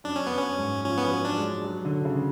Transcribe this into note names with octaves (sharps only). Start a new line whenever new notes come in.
F#2 D4
C#4
F#2 B3
C#4
G#2
F3 C#4
B3
C#4
F#3
D4
G#3
F#3
D3
C#3